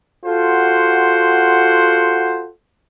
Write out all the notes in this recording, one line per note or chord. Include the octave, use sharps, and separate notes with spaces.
F4 F#4 A4 C5 F#5